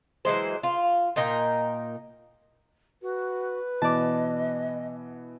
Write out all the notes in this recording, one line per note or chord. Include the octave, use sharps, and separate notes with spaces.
E3 F#3 G#3 C5
F4
A#2 D#4 A#4 G5
F#4 B4
B2 E3 B3 D5 D#5 A5